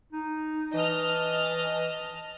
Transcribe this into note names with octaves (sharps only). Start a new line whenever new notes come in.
D#4
E3 D#5 A5 F6